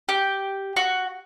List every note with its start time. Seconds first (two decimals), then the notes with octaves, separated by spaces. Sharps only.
0.09 G4
0.76 F#4